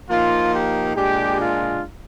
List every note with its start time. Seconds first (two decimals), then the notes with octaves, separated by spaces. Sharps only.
0.10 F3 A#3 D#4 F4
0.53 G4
0.96 A#2 G#3 D4 G4
1.39 F4